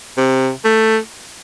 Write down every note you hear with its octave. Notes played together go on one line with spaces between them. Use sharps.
C3
A3